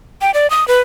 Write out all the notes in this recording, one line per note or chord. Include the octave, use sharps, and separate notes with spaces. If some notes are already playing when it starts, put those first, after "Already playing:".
G5
D5
D#6
B4